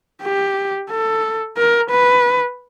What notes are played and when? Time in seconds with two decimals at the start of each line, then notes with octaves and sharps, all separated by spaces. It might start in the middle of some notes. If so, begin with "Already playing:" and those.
0.23 G4
0.90 A4
1.57 A#4
1.90 B4